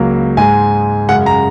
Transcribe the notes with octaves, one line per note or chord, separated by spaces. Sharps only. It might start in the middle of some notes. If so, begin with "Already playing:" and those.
Already playing: C#2 C#3 F#3 A#3
G#2 G#3 G#5
F#2 C#3 G#3 F#5
A#5